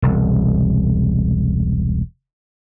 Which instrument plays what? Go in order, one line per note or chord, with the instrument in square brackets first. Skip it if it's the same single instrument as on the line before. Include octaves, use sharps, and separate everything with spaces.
[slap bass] E1 C2